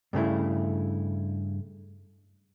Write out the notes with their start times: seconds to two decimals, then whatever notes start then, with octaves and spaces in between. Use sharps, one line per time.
0.13 G2 C#3 A3 E4